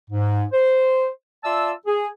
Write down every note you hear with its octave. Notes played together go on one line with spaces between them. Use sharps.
G#2
C5
F4 D5 E5 A5 E6
G#4